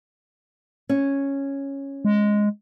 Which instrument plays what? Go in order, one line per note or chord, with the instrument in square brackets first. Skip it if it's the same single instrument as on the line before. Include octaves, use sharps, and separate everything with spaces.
[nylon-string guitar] C#4
[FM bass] G#3